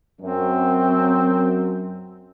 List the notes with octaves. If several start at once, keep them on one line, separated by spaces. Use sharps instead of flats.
F#2 C4